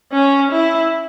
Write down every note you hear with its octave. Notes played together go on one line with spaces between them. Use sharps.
C#4
E4